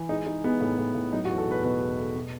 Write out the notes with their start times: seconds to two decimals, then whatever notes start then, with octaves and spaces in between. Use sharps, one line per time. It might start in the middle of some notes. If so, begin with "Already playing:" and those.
Already playing: E3
0.09 G#3 D#4
0.26 G#3 D#4
0.44 G#3 B3
0.61 A2
0.78 A2
0.95 A2
1.13 F#3 D#4
1.25 F#4
1.29 E2
1.38 A4
1.47 B2 B4
1.63 B2 B4
1.82 E2
1.98 A3
2.16 B2